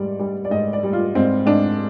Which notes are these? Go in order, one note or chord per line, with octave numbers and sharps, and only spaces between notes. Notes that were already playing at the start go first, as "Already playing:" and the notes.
Already playing: G#2 G3 D5
G3
D5
G#2 D#5
D5
G3
F4
G#2 C4
G#2 D4